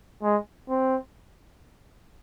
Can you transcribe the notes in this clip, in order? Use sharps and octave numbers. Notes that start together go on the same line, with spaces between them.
G#3
C4